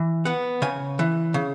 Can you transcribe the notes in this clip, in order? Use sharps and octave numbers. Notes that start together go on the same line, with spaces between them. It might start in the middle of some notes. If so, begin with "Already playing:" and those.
Already playing: E3
B3 F#5
C#3 G#5
E3
C#3